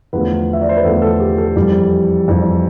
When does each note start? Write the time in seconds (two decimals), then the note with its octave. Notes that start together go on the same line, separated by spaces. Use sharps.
0.13 E2 D3 F3 A3 B4
0.53 E5
0.61 D5
0.69 C5
0.77 B4
0.84 E2 D3 F3 A3 A4
1.02 A4
1.20 G4
1.38 A4
1.56 F2 E3 G3
2.28 F2 E3 G3